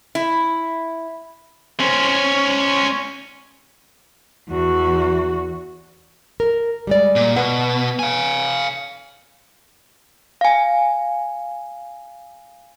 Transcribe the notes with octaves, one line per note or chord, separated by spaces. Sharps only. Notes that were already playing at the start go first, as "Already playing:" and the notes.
E4
C#4 C5
E2 F#4
A#4
G3 G#3 D5
A#2
B2 B4 F#5
F5 G#5
F5 G#5